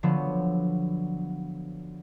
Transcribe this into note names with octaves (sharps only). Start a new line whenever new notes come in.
D3 F3 F#3 B3